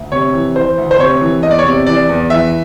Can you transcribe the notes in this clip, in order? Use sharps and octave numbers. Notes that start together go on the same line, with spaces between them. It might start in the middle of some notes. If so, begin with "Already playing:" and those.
Already playing: D2
C3 C#5
E3
E3 C5
D2
C5
C3 C#5
E3
E2 D#5
D5
C#5
C3 D5
E3 D5
E2
E3 E5